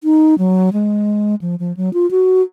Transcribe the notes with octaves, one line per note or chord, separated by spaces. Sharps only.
D#4
F#3
G#3
F3
F3
F#3
F4
F#4